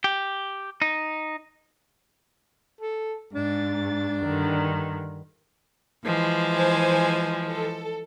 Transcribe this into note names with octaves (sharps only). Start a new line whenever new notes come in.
G4
D#4
A4
G#2 D4 A6
G2 D3 D#3
E3 F3 G#3
C5 G#5
A4